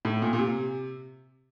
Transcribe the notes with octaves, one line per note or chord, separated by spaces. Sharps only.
A2
A#2
A#2
C3